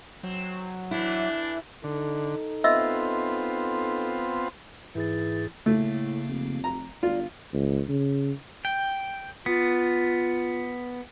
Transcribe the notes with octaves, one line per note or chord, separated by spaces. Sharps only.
F#3 C4
E3 A3 D4 E4
D3 D#4 A4
B3 C4 F4 D#5 E5 E6
G#2 E3 G#4 A6
A2 C#3 A3 A#3
F1
A#5
G1 F4 D5
C#2
C#3
G5
B3 F4